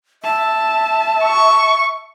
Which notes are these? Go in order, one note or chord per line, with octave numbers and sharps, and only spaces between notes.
E5 A5
C#6